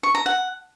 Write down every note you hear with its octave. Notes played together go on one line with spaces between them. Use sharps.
C#6
A#5
F#5